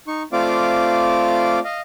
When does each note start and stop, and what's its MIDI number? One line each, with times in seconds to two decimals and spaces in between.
0.08 0.23 63
0.08 0.23 85
0.33 1.59 57
0.33 1.59 60
0.33 1.59 65
0.33 1.59 74
0.33 1.59 77
0.33 1.59 86
1.64 1.81 75
1.64 1.81 77